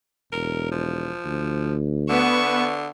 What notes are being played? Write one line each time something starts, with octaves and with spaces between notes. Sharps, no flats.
E1 A#4
F3
D2
D3 B3 C#6 E7